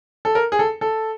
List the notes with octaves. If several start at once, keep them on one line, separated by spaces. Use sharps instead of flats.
A4
A#4
G#4
A4
A4